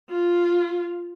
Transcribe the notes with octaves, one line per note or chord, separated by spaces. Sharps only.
F4